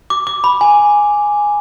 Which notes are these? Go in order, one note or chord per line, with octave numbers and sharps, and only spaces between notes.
D6
D6
B5
G#5